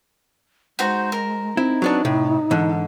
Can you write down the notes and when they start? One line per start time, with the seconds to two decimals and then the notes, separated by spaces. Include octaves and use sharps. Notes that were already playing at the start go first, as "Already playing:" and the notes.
0.79 G#3 D#4 F#4 C5
1.12 A#4
1.57 C4 D#4 E4
1.82 F#3 B3 D4
2.05 A2 C3
2.51 G#2 D3 E3